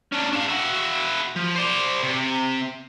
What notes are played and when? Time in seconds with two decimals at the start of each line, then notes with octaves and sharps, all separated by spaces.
0.12 C#4 D4
0.33 D4 F5
0.48 E4 F#4
1.36 F3
1.56 C5 D5
2.03 C3